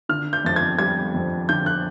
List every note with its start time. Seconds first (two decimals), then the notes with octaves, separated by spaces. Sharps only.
0.09 D3 F6
0.33 G6
0.45 F2 A6
0.56 G#6
0.79 G3 G#6
1.14 F2
1.49 D3 G6
1.66 F#6